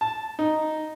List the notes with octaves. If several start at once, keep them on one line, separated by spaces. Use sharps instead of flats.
A5
D#4